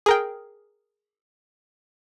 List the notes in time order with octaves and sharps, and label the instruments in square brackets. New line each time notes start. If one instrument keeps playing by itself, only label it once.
[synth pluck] G#4 A#4 G5